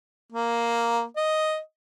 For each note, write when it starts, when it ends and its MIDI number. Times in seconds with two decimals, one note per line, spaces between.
0.33 1.05 58
1.16 1.58 75